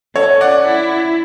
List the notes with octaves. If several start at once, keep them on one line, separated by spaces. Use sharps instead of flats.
C#4 A4 C#5
D5 F#5
E4